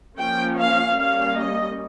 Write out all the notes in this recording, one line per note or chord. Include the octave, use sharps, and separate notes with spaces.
F3 A#3 C#4 G5
F5
G3 A#3 C#4 F5
D#5